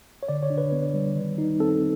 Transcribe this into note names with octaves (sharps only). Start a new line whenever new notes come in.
C#5
D3 D5
C#5
D4
B4
B3
G3
D#3
D#4
C4 A4